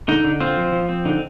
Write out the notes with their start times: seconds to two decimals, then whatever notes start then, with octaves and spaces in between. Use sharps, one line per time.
0.08 D3 D#4
0.24 D3
0.40 C4 F4
0.57 F3
0.72 F3
0.89 C4
1.05 D3 D#4